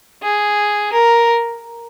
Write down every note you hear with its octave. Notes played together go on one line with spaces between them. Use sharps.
G#4
A#4